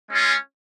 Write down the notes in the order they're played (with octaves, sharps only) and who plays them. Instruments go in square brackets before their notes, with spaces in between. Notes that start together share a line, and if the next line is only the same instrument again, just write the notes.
[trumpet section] G#3 C#4 F4